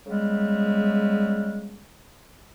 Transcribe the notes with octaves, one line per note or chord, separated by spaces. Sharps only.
C#3 G3 G#3 B3